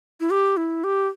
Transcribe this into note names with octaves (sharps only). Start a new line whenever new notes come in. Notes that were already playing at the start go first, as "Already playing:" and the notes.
E4
G4
E4
G4